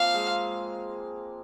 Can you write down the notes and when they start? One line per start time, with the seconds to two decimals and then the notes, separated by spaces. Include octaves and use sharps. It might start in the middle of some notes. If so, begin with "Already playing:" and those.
Already playing: F3 A#3 C4 F5
0.14 G#3